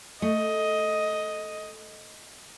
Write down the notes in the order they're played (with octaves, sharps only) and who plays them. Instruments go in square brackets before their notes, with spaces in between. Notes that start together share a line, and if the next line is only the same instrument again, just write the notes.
[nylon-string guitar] A3 [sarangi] D#5